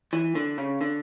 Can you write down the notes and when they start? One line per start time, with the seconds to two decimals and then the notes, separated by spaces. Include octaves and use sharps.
0.13 E3
0.35 D3
0.58 C#3
0.81 D3